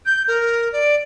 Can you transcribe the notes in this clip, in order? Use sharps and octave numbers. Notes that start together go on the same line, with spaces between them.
G6
A#4
D5